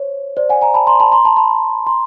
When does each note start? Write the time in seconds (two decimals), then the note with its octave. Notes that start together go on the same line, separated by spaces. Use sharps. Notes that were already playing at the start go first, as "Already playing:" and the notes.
Already playing: C5 C#5
0.37 C5 D5
0.49 F#5 G#5
0.61 G#5 A#5
0.74 A5 B5
0.87 A#5 C6
1.00 A5 B5
1.12 A#5 C6
1.25 A5 B5
1.37 A5 B5
1.87 A#5 C6